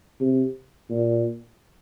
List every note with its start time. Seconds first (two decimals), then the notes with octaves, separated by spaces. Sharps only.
0.20 C3
0.90 A#2